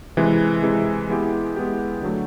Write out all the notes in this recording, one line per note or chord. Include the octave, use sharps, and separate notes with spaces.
C3 E3 G#3
C3 E3 G#3
G#3 B3 E4 G4
G#3 B3 E4 G4
D3 F#3 A3